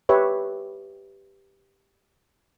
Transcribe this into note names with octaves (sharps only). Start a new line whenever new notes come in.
G4 B4 C#5 E5